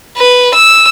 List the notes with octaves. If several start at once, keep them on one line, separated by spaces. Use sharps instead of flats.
B4
E6